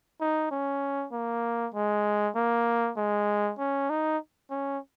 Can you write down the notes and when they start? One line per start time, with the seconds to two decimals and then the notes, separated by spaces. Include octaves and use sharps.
0.20 D#4
0.51 C#4
1.12 A#3
1.74 G#3
2.36 A#3
2.97 G#3
3.59 C#4
3.90 D#4
4.50 C#4